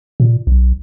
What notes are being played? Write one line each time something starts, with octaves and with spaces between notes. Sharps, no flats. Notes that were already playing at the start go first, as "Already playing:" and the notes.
A#2
B1